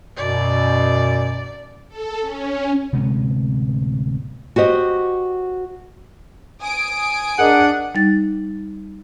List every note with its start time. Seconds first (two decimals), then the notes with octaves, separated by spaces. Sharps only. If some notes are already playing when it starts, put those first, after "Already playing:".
0.17 F#2 B2 D5
1.89 A4
2.21 C#4
2.93 D1 C3 G#3 B3
4.56 F#4 G4 C5 D#5
6.61 G#5 D#6 D7
7.39 D4 G#4 A#4 D#5 F#5
7.95 G3 D#4 A6